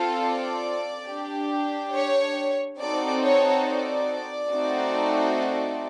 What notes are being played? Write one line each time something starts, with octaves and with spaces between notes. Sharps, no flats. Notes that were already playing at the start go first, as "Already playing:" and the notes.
Already playing: C4 F4 A4
D5
D4 G4
C#5
C4 D#4 F#4 A4 D5
C#5
D5
A3 C4 D#4 F#4 A4